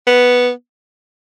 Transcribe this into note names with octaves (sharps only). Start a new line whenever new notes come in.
B3